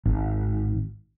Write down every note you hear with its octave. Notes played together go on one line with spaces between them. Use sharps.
G#1